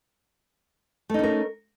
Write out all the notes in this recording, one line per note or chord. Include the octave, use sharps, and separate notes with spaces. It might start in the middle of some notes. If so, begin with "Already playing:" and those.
A3 C#4 D#4 A#4